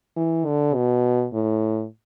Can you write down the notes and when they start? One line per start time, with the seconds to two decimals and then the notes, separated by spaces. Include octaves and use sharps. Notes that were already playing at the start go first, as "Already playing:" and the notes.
0.17 E3
0.46 D3
0.75 B2
1.33 A2